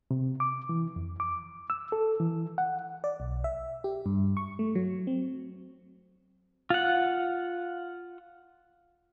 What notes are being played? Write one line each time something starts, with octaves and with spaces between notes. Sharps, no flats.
C3
D6
E3
F2
D6
E6
A4
E3
F#5
D5
B1
E5
G4
G2
C#6
A3
F#3
C4
F4 F#5